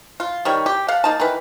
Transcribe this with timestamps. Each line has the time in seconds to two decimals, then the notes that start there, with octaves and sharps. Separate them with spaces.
0.20 F4
0.45 D#3 G3 C#5
0.66 G4
0.88 A4 F5 F#5
1.04 A#3 D#4 A5
1.20 D#3 E3 B4